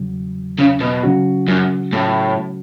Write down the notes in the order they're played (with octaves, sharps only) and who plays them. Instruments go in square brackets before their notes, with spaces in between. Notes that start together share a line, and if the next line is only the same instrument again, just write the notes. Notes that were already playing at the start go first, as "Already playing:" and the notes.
Already playing: [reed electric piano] E2 C#3 F#3
[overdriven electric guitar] C#3
B2
[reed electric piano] C#3 F#3 C#4 F#4
[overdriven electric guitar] F#2
A2